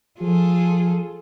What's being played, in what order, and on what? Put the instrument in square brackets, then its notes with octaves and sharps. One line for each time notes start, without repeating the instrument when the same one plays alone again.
[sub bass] F3 [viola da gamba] F4 G#4 A4